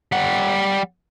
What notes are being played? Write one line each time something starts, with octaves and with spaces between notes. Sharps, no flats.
G3 F#5